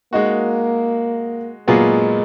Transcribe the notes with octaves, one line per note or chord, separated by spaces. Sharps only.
G#3 A#3 D#4 F#4
A#2 F#3 G#3 B3 F4 G#4